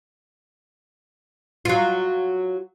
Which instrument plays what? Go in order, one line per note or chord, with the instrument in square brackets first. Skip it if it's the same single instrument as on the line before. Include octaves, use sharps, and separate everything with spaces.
[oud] F#3 F4